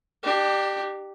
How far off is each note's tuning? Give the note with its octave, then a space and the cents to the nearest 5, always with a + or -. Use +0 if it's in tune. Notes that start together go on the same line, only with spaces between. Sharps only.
D4 +35 G4 +0